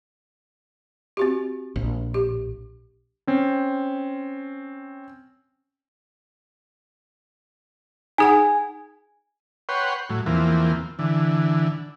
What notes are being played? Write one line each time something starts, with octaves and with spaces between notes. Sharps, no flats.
C4 F#4 G4
A#1
G4
C4 C#4
D#4 G#4 F#5 G#5
B4 C#5 F#5 G5 C6
A2 F#3
E2 E3 F3 A#3 C4
D3 E3